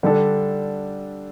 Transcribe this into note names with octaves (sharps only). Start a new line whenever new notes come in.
D3 G3 D4 A4